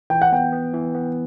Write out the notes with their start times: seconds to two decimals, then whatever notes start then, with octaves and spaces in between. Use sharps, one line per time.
0.10 E3 G5
0.22 F#5
0.32 B3 G5
0.52 B3
0.74 E3
0.95 B3